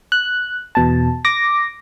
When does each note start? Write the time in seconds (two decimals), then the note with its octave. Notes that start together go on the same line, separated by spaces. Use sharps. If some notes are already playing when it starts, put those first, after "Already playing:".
0.12 F#6
0.75 E2 B2 A5
1.25 D6 A#6